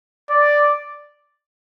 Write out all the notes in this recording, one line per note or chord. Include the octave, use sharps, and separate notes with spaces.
D5